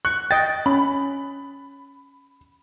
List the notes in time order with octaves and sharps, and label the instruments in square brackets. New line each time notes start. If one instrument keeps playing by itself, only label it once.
[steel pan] C#6 [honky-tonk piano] F#6
[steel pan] D#5 G5 [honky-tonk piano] A6
[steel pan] C#4 [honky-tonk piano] B5